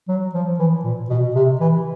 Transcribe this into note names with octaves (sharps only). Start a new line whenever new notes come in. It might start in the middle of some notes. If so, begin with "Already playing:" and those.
F#3
F3
E3
A#2
B2
C3
E3